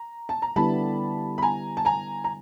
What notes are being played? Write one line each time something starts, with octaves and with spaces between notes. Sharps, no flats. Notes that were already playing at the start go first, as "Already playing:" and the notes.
Already playing: A#5
A5
A#5
D3 G3 B3 E4 A5 B5
B5
G#5 A#5
A5
G#5 A#5
A#5